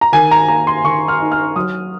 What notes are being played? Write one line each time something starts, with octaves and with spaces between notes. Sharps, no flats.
A#5
D#3 G#5
A#5
A#3 A#5
C6
D#3 C#6
F6
D#4
F6
F#3 D#6